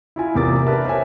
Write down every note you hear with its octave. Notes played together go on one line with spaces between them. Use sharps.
E4 F4 G#5
A1 E2 C3 A#3 D6 A6
D4 G4 A#4 B4 E5 A5
C5 C#5 E5 G#5